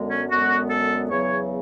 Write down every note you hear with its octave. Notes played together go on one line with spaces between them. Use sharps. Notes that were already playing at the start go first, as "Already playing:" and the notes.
Already playing: F#2 D3 G#3 B3
C#4
F#2 D3 G#3 B3 F#4
A4
E2 C#3 F#3 B3 C#5